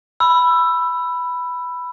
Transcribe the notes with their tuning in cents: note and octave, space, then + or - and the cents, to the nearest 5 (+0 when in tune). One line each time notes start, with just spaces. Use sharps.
B5 +0 E6 +15